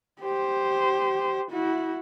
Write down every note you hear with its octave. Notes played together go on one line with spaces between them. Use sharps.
G4 C5
E4 F#4